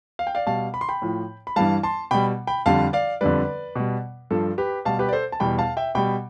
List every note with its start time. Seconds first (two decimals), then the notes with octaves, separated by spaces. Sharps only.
0.19 F5
0.27 G5
0.35 D5 F5
0.47 B2 G3 F5 A5
0.74 B5
0.81 C6
0.89 G5 B5
1.02 A2 F3
1.47 B5
1.56 G2 E3 G3 F5 A5
1.83 A5 C6
2.11 B2 G3 G5 B5
2.47 G5 B5
2.66 F2 D3 G3 F5 A5
2.93 D5 F5
3.21 F2 D3 G3 B4 D5
3.76 B2 G3
4.30 G2 F3 A4
4.58 G4 B4
4.85 B2 G3 F5 A5
4.99 G4 B4
5.09 D5
5.13 A4 C5
5.32 A5
5.40 E2 B2 G3 G5 B5
5.58 F5 A5
5.77 E5 G5
5.95 B2 G3 G5 B5